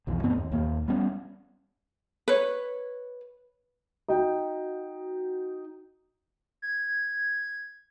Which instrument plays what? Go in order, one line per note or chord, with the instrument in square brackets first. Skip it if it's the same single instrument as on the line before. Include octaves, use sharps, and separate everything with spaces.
[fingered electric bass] B1 F2 E3
D2 G2 B3 C4
D#2
D#2 A#2 A#3
G3 B3 C#4
[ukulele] B4 C#5
[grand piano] D#4 F#4 G5
[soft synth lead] G#6